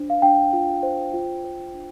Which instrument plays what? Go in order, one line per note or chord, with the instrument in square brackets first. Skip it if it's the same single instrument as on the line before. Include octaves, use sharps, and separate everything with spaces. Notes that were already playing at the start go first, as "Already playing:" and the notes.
Already playing: [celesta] D4 F4 C5
F5
D4 G5
F4
C5
F4
C5
D4